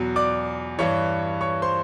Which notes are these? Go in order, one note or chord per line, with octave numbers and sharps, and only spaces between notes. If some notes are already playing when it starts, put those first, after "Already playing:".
Already playing: E2 B2 F#3
D5 D6
G2 E3 C#5 C#6
C#5 C#6
C5 C6